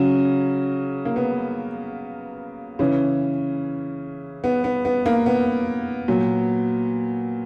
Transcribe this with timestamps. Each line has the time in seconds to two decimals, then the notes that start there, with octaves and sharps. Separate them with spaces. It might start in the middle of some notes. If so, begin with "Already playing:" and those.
Already playing: C#3 F#3 C#4
1.05 A#3
1.16 B3
2.79 C#3 E3 C#4
4.44 B3
4.64 B3
4.85 B3
5.06 A#3
5.26 B3
6.08 A#2 F#3